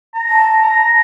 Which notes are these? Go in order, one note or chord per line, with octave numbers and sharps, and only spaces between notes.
A#5
A5
A#5